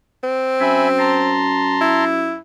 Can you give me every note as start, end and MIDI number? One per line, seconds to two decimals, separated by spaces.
0.24 1.46 60
0.61 2.35 42
0.61 0.88 76
0.61 0.88 80
0.61 0.88 83
0.99 2.04 81
0.99 2.04 82
0.99 2.04 84
1.81 2.37 64